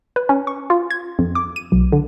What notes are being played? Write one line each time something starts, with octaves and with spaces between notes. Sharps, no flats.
B4
C#4
C#6
F4
G#6
F2
D6
D#7
B1
D3